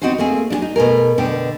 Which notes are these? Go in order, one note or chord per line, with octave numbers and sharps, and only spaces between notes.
B3 C4 D#4 F#4 G#4 C5
A3 A#3 C4 G#4
D4 E4 G#4
D#4
B2 A3 G#4 A#4
B2 D3 G5